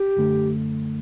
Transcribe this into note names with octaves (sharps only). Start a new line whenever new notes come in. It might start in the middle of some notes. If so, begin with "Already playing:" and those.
Already playing: G4
F#2 D3 A3